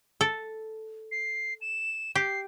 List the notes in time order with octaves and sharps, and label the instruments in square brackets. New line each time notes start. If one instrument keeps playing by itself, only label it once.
[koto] A4
[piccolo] C7
E7
[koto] G4 [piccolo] C7